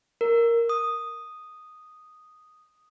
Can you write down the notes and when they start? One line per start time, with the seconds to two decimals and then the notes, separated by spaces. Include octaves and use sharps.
0.21 A#4
0.69 D#6